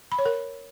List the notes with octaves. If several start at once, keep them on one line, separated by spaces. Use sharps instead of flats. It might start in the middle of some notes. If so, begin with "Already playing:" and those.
B5
C#5
A#4